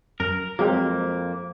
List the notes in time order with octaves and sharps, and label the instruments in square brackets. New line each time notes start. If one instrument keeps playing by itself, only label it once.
[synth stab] F#2 [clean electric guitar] A#4
[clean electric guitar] F2 A#3 [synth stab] F#3 G#3 C4